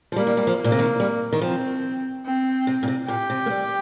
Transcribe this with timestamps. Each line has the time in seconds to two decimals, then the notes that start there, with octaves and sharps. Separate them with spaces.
0.12 F3
0.16 G3 A#3
0.27 G3
0.37 G3
0.47 F3
0.58 A#3
0.64 A#2
0.72 C3
0.79 D#3
1.00 G3
1.33 D#3
1.41 F3 C4
2.25 C4
2.67 C3
2.83 A#2
2.88 C3
3.08 A#2 G4
3.30 C3
3.46 A#3
3.50 G3